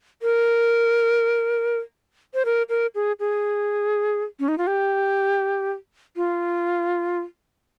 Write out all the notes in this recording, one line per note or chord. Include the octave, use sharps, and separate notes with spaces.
A#4
C5
A#4
A#4
G#4
G#4
C#4
D#4
F4
G4
F4